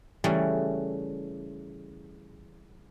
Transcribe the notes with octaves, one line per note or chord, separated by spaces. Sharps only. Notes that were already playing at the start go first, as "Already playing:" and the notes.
C#3 E3 G3 A3 C#4